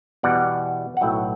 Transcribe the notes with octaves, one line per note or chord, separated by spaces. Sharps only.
E2 B2 G3 D5 F#5
F#5
B1 A2 F#3 E5 G5